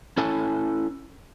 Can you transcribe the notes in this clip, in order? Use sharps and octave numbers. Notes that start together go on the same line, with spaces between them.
C#4 E4 A4 G#5 A5